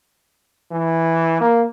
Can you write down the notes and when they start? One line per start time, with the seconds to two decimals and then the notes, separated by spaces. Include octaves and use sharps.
0.71 E3
1.41 A#3